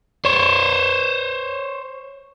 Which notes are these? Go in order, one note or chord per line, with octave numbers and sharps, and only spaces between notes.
C5 C#5